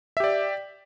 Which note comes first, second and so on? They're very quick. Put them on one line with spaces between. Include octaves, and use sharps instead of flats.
E5 G4 D5